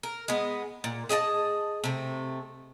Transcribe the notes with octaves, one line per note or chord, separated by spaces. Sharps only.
A#4
G#3 B3
A#2
G#4 D#5 F5 A5
C3 A3